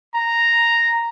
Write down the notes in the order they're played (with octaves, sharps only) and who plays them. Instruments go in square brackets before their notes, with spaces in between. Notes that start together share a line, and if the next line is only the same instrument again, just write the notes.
[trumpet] A#5